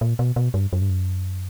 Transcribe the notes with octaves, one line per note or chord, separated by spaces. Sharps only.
A#2
B2
B2
G2
F#2
G2
F#2